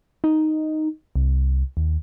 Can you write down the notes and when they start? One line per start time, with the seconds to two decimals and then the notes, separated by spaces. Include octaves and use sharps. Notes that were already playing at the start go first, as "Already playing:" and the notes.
0.24 D#4
1.16 C2
1.77 D#2